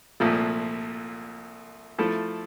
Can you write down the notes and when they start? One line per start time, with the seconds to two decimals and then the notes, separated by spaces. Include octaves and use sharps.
0.20 C2 A#2 F3 A3
1.98 F3 A3 E4 A4